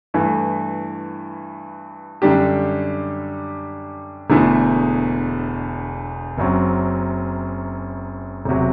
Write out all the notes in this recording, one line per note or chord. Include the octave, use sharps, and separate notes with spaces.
G2 E3 A3 E4
F#2 D3 G3 D4 G4
E1 E2 D3 A3 E4
F#1 F#2 F#3 C4
E1 C3 F#3